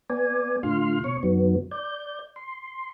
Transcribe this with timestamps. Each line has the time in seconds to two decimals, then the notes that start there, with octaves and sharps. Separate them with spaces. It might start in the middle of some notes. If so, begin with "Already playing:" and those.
0.10 B3 D5 G#5
0.63 A2 D3 F4 C6 F6
1.04 B2 C#5 C#6
1.23 F#2 D#3 F#3 B3
1.71 D5 G6
2.36 C6